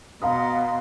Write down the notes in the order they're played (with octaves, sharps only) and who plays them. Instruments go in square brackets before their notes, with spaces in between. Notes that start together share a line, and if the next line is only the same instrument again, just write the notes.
[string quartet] B2 C6 [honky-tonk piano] F5 A#5 D#6